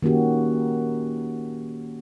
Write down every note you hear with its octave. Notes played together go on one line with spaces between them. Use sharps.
D#3 A#3 C#4 F#4 G4